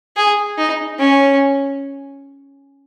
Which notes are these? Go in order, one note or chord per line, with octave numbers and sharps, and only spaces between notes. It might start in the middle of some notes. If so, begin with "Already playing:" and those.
G#4
D#4
C#4